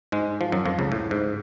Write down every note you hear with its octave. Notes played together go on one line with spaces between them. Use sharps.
G#2 G#3
F3
F#2 F#3
F2 F3
C#2 C#3
A2
G#2